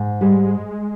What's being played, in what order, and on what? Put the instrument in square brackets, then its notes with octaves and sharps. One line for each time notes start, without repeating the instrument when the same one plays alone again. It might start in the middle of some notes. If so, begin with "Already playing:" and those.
Already playing: [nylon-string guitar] G#2
[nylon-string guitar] G3 [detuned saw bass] G#3